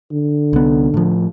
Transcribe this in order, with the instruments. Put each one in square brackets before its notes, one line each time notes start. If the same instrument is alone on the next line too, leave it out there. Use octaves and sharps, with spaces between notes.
[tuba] D3
[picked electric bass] C2 B3
A2 F3